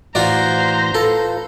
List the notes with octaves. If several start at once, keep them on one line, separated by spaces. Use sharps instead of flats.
A2 E3 F4 F#4 C5 D5 A#5
F4 A4 B4